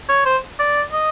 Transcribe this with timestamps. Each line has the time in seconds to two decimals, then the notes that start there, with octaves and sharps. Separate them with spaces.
0.09 C#5
0.26 C5
0.59 D5
0.93 D#5